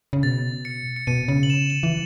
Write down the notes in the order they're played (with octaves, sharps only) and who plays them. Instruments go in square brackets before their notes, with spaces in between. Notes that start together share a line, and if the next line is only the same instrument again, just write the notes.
[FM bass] C#3
[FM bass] B2 [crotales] A6
[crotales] C#7
C#7
[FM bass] B2 [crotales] D#7
[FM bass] C#3
[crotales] F#7
E7
F#7
[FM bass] E3